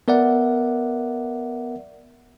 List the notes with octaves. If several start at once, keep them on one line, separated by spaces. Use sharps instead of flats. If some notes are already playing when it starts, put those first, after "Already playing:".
B3 A#4 D5 E5 F#5